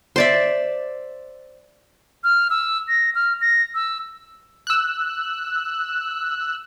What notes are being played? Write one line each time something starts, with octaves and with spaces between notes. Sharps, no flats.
C5 D5 E5
F6
E6
A#6
F6
A#6
E6
E6 F#6